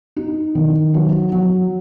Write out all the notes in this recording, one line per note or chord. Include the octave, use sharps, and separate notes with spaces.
D#4
D#3
F#3
F#3